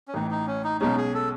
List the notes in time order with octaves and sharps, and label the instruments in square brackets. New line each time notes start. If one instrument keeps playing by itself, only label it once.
[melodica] C#4
[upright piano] A1 A2 E3 [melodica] D#4
[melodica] D#4
C#4
D#4
[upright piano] B1 B2 G#3 C#4 [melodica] D#4
[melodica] G#4
A4